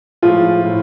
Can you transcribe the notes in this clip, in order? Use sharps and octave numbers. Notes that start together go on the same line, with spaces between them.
A2 F3 G#3 F4
A2